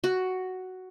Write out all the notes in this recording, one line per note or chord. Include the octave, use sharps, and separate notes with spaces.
F#4